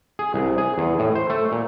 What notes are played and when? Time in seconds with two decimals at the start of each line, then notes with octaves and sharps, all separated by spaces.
0.19 G#4
0.34 C2
0.58 G#4
0.78 E2
0.99 A2
1.15 C5
1.30 A3
1.52 A#2